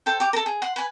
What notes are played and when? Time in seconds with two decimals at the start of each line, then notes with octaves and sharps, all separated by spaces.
0.06 A4 C5 G5
0.20 G4 D6
0.33 A4 A#4
0.46 G#4
0.62 F#5 C6
0.76 B4 G#5